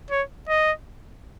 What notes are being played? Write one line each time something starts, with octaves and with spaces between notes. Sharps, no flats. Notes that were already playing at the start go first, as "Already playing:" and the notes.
C#5
D#5